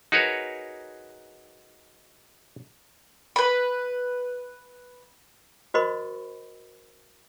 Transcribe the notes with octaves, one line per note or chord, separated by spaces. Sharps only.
D#4 F#4 G#4 A#4 B4 C#5
B4 B5
F#4 A#4 C5 D#5 B5 C#6